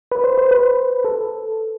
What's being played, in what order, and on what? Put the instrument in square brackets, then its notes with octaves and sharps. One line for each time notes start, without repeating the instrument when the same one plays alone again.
[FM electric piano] B4
C5
C5
B4
A4